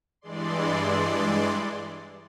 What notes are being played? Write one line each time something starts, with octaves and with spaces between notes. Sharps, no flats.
G2 E3 G#3 D5 C6